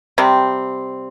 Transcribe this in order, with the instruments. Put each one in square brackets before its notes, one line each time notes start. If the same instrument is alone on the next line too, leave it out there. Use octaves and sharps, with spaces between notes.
[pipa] C3 G3 C4